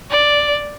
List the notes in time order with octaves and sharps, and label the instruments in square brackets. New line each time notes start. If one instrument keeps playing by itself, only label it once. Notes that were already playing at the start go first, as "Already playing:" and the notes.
[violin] D5